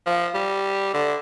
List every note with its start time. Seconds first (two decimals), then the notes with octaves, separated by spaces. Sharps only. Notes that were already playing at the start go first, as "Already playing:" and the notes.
0.06 F3
0.34 G3
0.94 D3